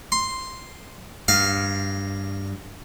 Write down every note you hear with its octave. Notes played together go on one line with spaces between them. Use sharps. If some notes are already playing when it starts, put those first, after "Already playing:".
C6
G2 F5